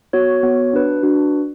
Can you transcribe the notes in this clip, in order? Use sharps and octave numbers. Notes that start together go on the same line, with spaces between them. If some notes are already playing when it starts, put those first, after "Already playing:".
B3 F#4 C#5
B3 F#4 C#5
D4 F#4 B4
D4 F#4 B4